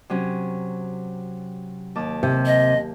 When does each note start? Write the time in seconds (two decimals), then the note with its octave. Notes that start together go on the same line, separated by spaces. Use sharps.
0.10 C3 F#3 C#4
1.95 D#2 A5 D6
2.23 C3
2.46 D#5